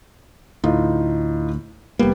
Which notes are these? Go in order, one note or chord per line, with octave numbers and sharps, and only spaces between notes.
D2 A2 D#4 F4
F1 G3 A#3 B3